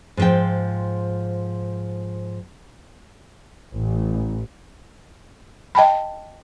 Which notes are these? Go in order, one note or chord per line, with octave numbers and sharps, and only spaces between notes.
G#2 F3 G5
A1
D#5 G5 A5 B5